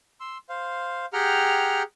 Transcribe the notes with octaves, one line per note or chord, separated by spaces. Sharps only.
C6 E6
C5 F5
G4 G#4 F#5 G5 A#5 F6